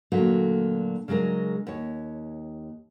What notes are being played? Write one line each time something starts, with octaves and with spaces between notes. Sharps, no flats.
A#2 D3 F#3 A3 A#3
C#3 F#3 G#3 D4 A#4
D#2 C#5